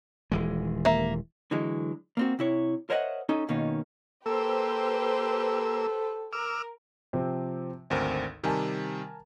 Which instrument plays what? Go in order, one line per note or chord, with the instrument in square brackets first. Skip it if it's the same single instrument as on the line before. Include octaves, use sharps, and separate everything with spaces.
[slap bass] D#1 E3 G#3
[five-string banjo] A#3 E5
[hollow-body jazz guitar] D3 E3 F#3 G#3
A#3 C4 F#4
C3 E4 C#5
A#4 C5 C#5 D#5 E5 F#5
C#4 D#4 A4 D#5
B2 D#3 A#3 C#4 D#4
[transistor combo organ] A#3 E6 [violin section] G4 B4 C5 [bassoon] A4
[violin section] A#4 [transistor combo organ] D6 E6 F6
[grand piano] C3 F3 C4
[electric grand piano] G#1 D2 A#4 [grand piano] C4
[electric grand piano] C3 D#3 G3 [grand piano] A#4 G#5 A5